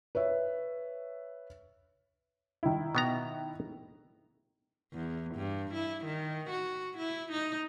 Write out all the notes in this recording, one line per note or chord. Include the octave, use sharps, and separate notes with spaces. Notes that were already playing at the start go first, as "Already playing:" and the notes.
B4 C#5 E5
D#3 E4
B2 B3 A#5
E2
G2
E4
D#3
F#4
E4
D#4